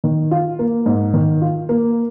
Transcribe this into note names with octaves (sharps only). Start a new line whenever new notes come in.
D#3
F4
A#3
G#2
D#3
F4
A#3